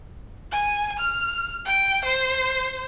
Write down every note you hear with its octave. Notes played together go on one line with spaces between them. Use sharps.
G#5
F6
G5
C5